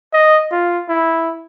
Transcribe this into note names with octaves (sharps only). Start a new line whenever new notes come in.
D#5
F4
E4